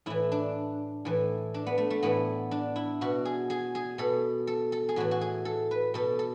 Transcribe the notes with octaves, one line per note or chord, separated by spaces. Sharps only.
A2 E3 E4
D4
A2 E3
D4
B3
A3
A3
A2 E3 B3
D4
E4
B2 F#4
G#4
G#4
G#4
B2 A4
A4
A4
G#4
A2 E3 F#4
F#4
G#4
A4
B4
B2 A4
A4